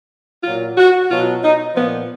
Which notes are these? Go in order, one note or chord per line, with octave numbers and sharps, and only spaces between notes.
A#2 F#3 F4
F#4
B2 F#3 F4
D#4
A#2 F3 B3